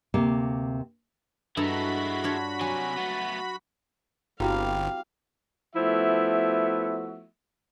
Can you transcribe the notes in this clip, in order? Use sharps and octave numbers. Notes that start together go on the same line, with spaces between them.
D2 C3 A#3 F5
G2 G#3 E4 F#4 A4 A#5 B5
D4 F4 C#5
C3 F#3 G#5
A3 B3
G1 G3 C4 E4 F#4 G#4 F5
F3 A3 B3 E4 F#4 E5